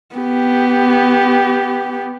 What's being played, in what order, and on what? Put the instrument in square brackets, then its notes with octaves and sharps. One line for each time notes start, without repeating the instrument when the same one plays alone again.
[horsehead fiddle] B3 G4